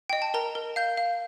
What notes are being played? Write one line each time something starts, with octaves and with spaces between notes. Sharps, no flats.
D#5 G5
A5
A#4 A#5
A#4
F5 G6
F5